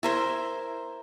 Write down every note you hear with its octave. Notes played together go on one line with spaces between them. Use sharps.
E4 A#4 C5